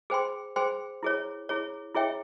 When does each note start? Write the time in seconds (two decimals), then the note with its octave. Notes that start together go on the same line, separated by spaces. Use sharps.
0.10 G#4 C5 G5 C6
0.56 G#4 C5 G5 C6
1.03 E4 G#4 C#5
1.49 E4 G#4 C#5
1.95 E4 G#4 C#5 E5 G5